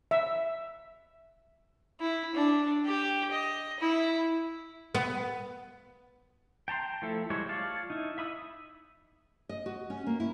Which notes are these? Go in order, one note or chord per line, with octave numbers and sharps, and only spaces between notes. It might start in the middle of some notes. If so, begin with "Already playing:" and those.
E5
E4
D4
G4
D#5
E4
B3
G5 A5 A#5 C6
F3 A3 E4 A4
G3 G#3 E4 C5 C#5
F4 C#5 D5 F5 A5
D#4 E4
E5 B5 D#6 E6
D#5
F#4
C#4
A#3
E4